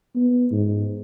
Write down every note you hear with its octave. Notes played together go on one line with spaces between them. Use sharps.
B3
G#2